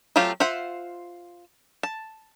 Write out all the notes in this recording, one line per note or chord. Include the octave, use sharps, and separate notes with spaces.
F#3 A3 C4 F4 G4
F4 C5 E5 F#5
A5